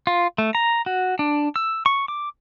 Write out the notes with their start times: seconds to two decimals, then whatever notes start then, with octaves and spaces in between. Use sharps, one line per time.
0.07 F4
0.38 A3
0.55 A#5
0.86 F#4
1.19 D4
1.56 E6
1.86 C#6
2.08 D6